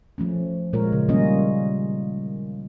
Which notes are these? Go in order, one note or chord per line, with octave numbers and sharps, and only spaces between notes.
F3 A3 C#4
A#2 G#3 F4 A#4 C#5
C#3
D#3 G3 A#3 C#4 F4 D#5